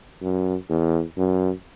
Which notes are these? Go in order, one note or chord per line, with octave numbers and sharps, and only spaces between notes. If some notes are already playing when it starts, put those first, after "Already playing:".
F#2
E2
F#2